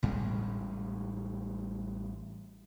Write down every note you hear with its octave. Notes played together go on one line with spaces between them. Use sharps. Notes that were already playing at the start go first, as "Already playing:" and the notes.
A1 A2 G3 G#3